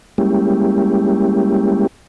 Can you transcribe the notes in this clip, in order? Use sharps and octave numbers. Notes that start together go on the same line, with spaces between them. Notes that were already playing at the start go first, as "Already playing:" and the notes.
G3 G#3 A#3 C#4 E4 G4